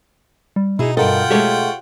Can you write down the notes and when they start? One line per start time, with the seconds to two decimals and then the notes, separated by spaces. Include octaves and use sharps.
0.56 G3
0.79 B2 D#4 E4 G#4
0.97 G2 F4 A4 A#4 D#5 F#5 G5
1.31 G#3 A3 G4 A4 C#5